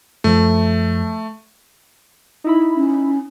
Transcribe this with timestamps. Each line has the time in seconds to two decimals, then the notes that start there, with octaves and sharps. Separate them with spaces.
0.24 F#2 F3 A3
2.44 D#4 E4 B5
2.76 C#4